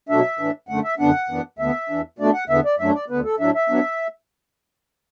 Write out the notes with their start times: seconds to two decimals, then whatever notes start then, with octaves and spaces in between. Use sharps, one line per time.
0.09 B2 F#3 A3 D4 E5
0.39 A2 E3 D4
0.69 F#2 D3 A3 F#5
0.84 E5
0.99 F#2 D3 B3 D4 F#5
1.29 F#2 E3 B3 D4
1.59 D2 D3 B3 E5
1.90 E2 E3 D4
2.19 B2 A3 D4 D5
2.34 F#5
2.49 E2 D3 B3 E5
2.65 D5
2.79 F#2 F#3 A3 D4 E5
2.94 D5
3.10 D2 D3 B3 B4
3.25 A4
3.40 A2 F#3 D4 E5
3.55 E5
3.69 F#3 B3 D4